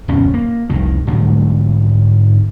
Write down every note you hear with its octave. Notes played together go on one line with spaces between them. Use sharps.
D1 F#2 B2 C#4
A#3
F1 C2 D#3
G#2 D3 F#3 G3